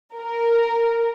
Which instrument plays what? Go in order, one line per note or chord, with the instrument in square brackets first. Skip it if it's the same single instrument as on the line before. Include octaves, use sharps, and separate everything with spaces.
[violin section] A#4